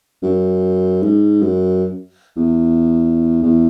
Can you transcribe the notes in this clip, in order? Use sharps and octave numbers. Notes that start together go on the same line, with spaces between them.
F#2
G#2
F#2
E2
E2